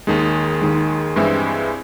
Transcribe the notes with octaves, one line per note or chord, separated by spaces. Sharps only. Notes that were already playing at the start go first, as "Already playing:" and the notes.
D#2 D#3 G#3
D#2 D#3 G#3
G2 E3 G#3 C4 E4